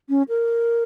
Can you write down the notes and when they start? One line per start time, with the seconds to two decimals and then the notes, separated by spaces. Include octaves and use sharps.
0.09 C#4
0.29 A#4